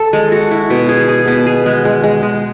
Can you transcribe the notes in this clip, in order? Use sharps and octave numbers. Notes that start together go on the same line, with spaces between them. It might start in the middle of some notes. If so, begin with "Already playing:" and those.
Already playing: A4
G#3
F#4
E4
B2
G#4
G#4
B2
G#4
G#3
G#3
G#3
G#3